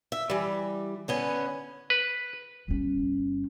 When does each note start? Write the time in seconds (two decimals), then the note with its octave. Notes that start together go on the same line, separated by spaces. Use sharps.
0.12 E5
0.30 E3 G3
1.08 D3 B3 C#4
1.90 B4
2.68 G1 C#4